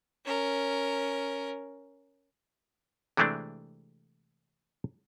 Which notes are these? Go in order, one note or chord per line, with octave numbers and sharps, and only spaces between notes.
C#4 A#4
C3 E3 G#3 A3 C4 D4